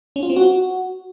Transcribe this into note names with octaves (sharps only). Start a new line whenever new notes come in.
C#4
F4
C4
F#4